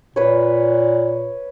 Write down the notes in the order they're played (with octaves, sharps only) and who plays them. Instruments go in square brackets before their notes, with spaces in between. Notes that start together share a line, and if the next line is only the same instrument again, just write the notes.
[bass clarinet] A#2 [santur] B4 C#5